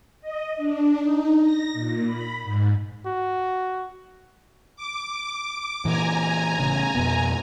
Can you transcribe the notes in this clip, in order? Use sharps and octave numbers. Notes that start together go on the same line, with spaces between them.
D#5
D4
D#4
A#6
A#2
B5
G#2
F#4
D6
A#2 E3 G#5 A#5
A1 C#3
F2 B2 B3